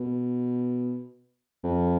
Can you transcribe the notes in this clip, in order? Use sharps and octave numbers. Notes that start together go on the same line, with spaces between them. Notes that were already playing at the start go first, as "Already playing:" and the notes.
Already playing: B2
F2